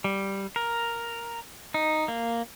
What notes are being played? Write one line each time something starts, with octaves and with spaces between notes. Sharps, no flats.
G3
A#4
D#4
A#3